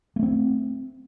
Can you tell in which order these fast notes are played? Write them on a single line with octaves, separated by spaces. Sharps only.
A#3 A3 C4